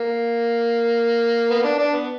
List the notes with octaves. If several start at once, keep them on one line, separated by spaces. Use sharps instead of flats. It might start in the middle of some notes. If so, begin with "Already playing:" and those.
Already playing: A#3
B3
B3
D4
D4
B3